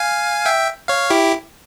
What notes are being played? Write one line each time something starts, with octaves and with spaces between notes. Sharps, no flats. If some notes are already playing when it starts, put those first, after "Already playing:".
Already playing: F5 G#5
E5 G5
C#5 F5
E4 G4